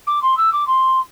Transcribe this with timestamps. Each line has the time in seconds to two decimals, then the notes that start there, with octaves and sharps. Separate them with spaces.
0.07 D6
0.22 C6
0.37 E6
0.53 D6
0.67 C6